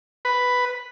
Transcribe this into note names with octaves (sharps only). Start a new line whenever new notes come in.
B4